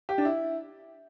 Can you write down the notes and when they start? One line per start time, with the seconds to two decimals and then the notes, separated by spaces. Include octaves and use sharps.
0.09 G4
0.18 D4
0.25 E4